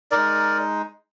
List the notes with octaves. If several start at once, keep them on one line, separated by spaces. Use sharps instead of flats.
G#3 D#4 A#4 D5